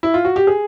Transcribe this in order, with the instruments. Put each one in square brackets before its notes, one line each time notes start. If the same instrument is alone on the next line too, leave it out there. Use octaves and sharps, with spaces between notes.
[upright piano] E4
F4
F#4
G4
G#4